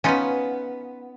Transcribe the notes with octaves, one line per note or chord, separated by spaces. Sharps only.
B3 C#4 D#4 F4 B4